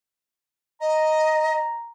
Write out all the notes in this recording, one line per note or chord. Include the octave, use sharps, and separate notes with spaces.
D#5 A#5